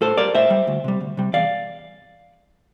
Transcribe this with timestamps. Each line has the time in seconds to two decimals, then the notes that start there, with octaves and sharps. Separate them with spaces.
0.01 A2 A4 C5
0.17 G3 A#4 D5
0.34 A2 C5 E5
0.50 G3
0.67 D2
0.84 C3 G3
1.01 D2
1.17 C3 G3
1.33 E2 D5 F5